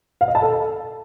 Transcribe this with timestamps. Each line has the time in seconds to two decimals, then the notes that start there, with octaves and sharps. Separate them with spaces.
0.21 F5
0.28 D#5
0.35 A5
0.42 A4